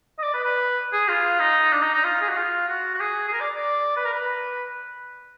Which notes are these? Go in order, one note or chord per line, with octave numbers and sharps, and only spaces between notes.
D#5
D5
B4
B4
G#4
F4
D#4
D4
D#4
D#4
F4
G#4
F#4
F4
F#4
F#4
G#4
G#4
A#4
D5
D5
B4
A#4
B4